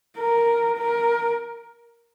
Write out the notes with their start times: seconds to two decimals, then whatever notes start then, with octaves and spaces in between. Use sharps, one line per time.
0.17 A#4
0.77 A#4